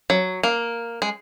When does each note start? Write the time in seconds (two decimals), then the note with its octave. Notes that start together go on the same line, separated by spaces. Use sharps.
0.10 F#3
0.43 A#3
1.02 G#3